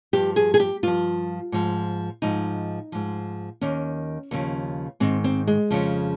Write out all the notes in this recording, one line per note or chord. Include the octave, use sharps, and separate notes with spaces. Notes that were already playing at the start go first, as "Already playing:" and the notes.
G2 F3 G4
G#4
G#4
G4
G2 F3 F4
G#2 F3
G#2 F3 D#4
G#2 F3
D#2 D#3 C#4
D#2 C#3 F3
G#2 D#3 C4
C4
G#3
F2 C#3 F3